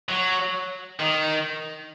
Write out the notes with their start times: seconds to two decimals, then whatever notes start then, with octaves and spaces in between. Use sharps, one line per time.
0.09 F#3
0.99 D#3